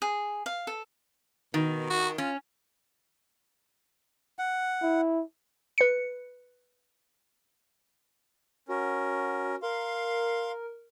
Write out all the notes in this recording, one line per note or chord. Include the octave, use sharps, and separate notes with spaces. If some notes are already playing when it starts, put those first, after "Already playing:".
G#4
F5
A4
B2 D#3
F#4
C#4 F4
F#5
E4
B4 C#7
C#4 F#4 A#4
A#4 F5 C6